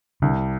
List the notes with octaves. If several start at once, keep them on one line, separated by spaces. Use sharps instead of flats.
C2 D3